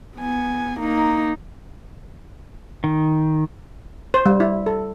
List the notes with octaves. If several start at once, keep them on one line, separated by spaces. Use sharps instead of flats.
B3 G#5
A#3 D#4
D#3
C5
G3
E4
A4